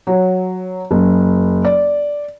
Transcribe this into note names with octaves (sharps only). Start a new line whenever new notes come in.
F#3
F#1
D5